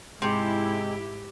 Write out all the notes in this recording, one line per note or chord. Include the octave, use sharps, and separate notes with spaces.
G#2 C3 G#3 E4 G4